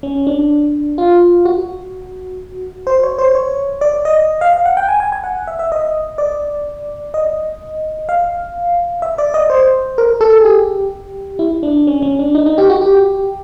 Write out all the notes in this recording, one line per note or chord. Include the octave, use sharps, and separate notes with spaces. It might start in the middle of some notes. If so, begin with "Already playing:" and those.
C#4
D4
F4
F#4
C5
C#5
C5
C#5
D5
D#5
F5
F5
F#5
G5
G#5
G#5
G#5
F#5
E5
E5
D#5
D5
D#5
F5
E5
D5
D#5
C5
A#4
A4
G#4
G4
E4
D4
C#4
C#4
D4
D#4
D#4
G4
F#4
G4